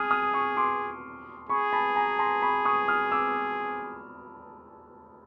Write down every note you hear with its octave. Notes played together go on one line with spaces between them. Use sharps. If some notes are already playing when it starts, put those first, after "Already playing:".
Already playing: G#4 D#6 F6
D#6 F6
C#6 D#6
C6 D6
G#4 B5 C#6
A5 B5
G#5 A#5
A#5 C6
B5 C#6
C#6 D#6
D#6 F6
D6 E6